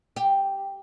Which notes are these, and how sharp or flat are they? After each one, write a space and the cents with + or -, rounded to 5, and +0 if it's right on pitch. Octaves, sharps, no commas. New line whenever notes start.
G4 +0